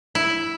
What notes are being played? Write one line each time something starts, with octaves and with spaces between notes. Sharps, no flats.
E4